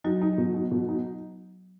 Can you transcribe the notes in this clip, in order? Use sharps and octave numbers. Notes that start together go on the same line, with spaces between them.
F#3 D#4 F#4
D#4
B2
D#4
B2
D#4